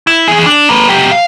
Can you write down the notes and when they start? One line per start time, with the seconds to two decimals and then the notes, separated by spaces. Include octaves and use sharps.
0.07 E4
0.28 E3 G#4
0.46 D4
0.69 A#3 B4
0.88 F#3 G4
1.12 F5